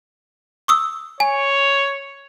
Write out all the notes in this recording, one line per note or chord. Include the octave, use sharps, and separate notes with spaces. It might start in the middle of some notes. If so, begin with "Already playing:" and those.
C#6 D#6 E6
C#5 G#5